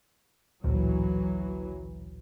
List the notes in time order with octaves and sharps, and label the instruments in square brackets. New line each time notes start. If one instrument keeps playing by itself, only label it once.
[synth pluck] A1 D2 A#2 [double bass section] E3 F#3